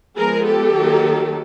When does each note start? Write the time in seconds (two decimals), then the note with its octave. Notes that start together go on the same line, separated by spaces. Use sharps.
0.18 F3 G#3 B3 G#4 A#4
0.46 G4 A4
0.75 D#3 F#3 A#3